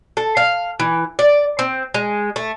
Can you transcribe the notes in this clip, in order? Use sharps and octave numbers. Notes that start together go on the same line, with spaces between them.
A4
F5
E3
D5
C4
G#3
A3